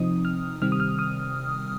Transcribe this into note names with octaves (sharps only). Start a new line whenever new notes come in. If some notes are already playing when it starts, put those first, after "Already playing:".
Already playing: C3 F3 C4 D#4 D#6
F6
C3 D#3 G3 C4 F6
D#6
F6
D#6